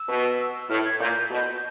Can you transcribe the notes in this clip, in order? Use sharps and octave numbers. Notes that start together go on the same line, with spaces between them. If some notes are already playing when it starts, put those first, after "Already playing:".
Already playing: E6
B2
A2 F6
G#6
A#2 G6
B2